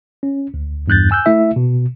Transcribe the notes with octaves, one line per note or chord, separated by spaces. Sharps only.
C#4
D2
E2 G2 F#6 G6 A6
G#5 E6 F#6 G6
A3 E4 E5
B2